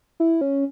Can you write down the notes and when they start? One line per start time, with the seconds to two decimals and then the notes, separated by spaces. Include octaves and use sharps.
0.20 E4
0.41 C#4